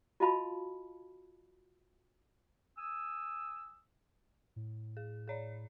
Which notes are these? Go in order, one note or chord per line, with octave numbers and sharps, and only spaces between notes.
F4 F#4 D#5 F5 A5 B5
G#5 D#6 E6
A2
G#4
G#4 C#5 D5